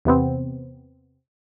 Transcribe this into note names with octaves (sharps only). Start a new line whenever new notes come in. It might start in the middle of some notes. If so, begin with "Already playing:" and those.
E2 C3 B3 C4